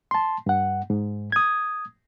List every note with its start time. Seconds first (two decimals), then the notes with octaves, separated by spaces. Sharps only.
0.11 A5 C6
0.46 G2 F#5
0.90 G#2
1.32 D#6 G#6